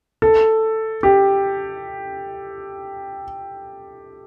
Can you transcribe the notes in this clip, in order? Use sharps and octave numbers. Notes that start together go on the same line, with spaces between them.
A4
G4